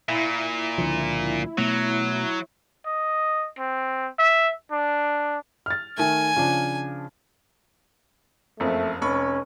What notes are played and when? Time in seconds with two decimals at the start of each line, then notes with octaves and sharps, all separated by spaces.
0.09 A#2 E4
0.78 C#2 D3 F3
1.58 B2 F#3 A3 B3
2.86 D#5
3.59 C4
4.19 E5
4.72 D4
5.66 F6 A6
5.98 D#3 A3 G#5
6.36 C#3 F3 D4
8.60 F#1 F2 A3
9.02 F1 C#4 B5 C#6